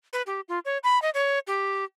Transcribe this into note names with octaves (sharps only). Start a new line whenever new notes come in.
B4
G4
F4
C#5
B5
D#5
C#5
G4